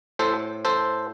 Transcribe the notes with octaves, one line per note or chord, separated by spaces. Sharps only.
A2 A4 C5
A4 C5